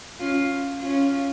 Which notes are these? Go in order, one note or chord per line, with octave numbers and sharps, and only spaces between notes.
C#4 F4
C#4 F4